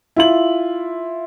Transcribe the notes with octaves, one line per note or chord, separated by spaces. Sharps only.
E4 F4 F#7